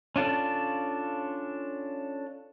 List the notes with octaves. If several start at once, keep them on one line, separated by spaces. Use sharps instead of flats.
C#4 D4 F4 A4